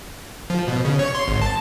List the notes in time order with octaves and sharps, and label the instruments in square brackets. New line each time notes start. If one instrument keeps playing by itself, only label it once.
[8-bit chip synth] F3
B2
C#3
C#5
C6
G#1
A5